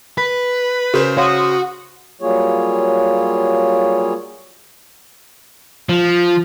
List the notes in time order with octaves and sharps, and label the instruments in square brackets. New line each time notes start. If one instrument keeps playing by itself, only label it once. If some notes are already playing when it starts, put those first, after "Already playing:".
[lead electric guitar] B4
[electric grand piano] C#3 C5 [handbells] F#4 G#4 A#4
[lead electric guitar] F#4 [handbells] C#5 F5 [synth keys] C6 D#6
[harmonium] F#3 G3 A#3 F4 G#4 C#5
[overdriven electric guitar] F3